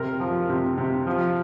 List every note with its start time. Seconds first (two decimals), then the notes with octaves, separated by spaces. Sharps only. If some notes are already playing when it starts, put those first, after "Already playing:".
Already playing: C3 A#4
0.20 F3
0.50 C3
0.78 C3
1.07 F3